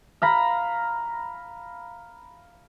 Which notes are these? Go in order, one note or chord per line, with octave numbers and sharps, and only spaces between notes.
F5 A#5 B5